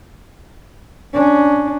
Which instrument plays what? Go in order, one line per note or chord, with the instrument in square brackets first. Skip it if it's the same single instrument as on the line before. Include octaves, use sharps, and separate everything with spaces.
[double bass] C#4 D4